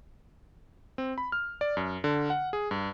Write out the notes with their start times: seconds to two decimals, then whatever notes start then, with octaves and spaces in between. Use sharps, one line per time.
0.98 C4
1.18 B5
1.32 F6
1.61 D5
1.77 F#2
2.04 D3
2.30 F#5
2.53 G#4
2.71 G2